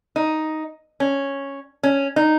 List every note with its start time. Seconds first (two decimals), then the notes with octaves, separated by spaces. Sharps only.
0.16 D#4
1.00 C#4
1.83 C#4
2.16 D#4